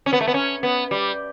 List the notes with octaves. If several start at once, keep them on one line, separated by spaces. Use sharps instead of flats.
C#4
B3
A3
B3
C#4
B3
G3